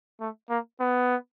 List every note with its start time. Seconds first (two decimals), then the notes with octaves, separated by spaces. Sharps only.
0.20 A3
0.49 A#3
0.80 B3